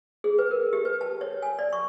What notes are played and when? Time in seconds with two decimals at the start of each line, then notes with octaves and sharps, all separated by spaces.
0.24 G#4
0.39 B4
0.51 A#4
0.73 G4
0.85 B4
1.01 A5
1.21 C#5
1.42 G#5
1.59 D5
1.73 C#6